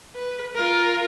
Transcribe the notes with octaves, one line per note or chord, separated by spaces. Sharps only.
B4
F4 A#4